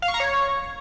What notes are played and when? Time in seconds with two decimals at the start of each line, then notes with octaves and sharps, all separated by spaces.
0.02 F5
0.08 C#6
0.14 A#5
0.20 C#5